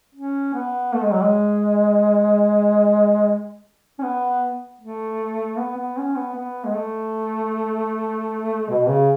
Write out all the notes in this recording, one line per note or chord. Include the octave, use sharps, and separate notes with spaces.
C#4
B3
A3
G#3
F#3
G#3
C#4
B3
A3
B3
B3
C#4
B3
B3
G#3
A3
B2
C#3